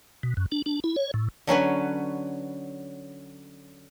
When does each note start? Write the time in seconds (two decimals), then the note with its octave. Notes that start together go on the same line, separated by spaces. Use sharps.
0.23 B2
0.37 F#2
0.52 D4
0.66 D4
0.84 E4
0.96 C#5
1.14 A2
1.47 D3 F#3 C#4 B4